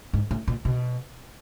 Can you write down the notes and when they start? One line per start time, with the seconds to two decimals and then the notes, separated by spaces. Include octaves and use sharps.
0.13 G#2
0.31 A2
0.48 A#2
0.65 B2